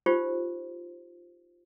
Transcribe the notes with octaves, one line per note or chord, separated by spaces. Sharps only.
D#4 F4 G4 C5